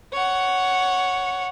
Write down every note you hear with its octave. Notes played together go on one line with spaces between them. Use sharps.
C#5 F#5